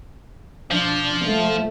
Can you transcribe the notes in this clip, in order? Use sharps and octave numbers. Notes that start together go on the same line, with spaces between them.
F3 D4
A3